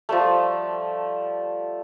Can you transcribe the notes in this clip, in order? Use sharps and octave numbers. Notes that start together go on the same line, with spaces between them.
F3 G3 A3